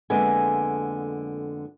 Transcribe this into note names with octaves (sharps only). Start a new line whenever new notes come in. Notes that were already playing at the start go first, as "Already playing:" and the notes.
F2 D3 G#3 A#3 B3 G#5